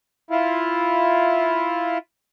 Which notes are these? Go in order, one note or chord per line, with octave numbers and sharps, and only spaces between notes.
E4 F4